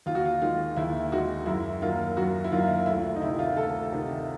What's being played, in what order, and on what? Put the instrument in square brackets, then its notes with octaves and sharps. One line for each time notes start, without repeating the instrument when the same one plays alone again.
[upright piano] D#2 F4
F#4
F4
D#3 G#3 F4
D#2 E4
D#3 G#3 F#4
F#2 E4
D#3 F#3 A#3 F4
F#2 F#4
E4
D#3 F#3 A#3 F4
D2 E4
D#4
C3 D#3 E4
F4
D2 A4
C3 D#3